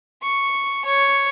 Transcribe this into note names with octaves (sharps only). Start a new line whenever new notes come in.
C#6
C#5